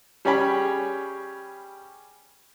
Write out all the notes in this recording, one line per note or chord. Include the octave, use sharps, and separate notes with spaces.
G3 C#4 G#4 C#5 G5 B5